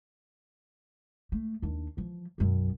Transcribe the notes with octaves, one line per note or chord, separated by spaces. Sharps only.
A3
D#2 D4
E3 F3
B1 F#2